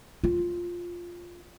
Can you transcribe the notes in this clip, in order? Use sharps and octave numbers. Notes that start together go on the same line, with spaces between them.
F4